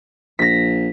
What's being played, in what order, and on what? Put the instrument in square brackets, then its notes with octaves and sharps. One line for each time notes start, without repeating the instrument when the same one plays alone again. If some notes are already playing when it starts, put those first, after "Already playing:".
[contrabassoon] A#1 [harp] A#6 B6